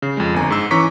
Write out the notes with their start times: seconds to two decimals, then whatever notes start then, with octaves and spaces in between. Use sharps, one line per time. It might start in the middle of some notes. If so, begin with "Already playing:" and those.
0.02 C#3
0.17 F2 G#3
0.34 G1 G#5 A#5
0.50 G#2 E6
0.71 E3 C#4 A#5 C#6 D6 B6